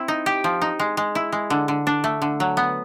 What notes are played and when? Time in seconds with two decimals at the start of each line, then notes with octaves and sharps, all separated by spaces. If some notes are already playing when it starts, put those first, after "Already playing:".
Already playing: C4 E4
0.08 D#4
0.26 G4
0.44 F3
0.62 D#4
0.79 G#3
0.97 G#3
1.15 E4
1.32 G#3
1.50 D3
1.68 D3
1.87 D4
2.04 A3
2.22 D3
2.40 F#3
2.57 B3